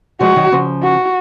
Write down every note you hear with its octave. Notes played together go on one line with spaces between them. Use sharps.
F3 G#3 F#4
D#3 F#3
C#3 F3
F#4